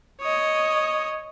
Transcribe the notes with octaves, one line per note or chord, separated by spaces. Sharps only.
C#5 D#5